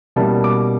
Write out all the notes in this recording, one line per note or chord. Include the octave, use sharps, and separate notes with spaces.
B2 G3 A#3 C#4 E4 A5
D6